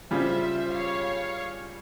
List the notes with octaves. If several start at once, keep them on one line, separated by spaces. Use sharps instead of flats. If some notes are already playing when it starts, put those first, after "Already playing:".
C#3 G3 C#4 F4 C5 E5
C#5 F5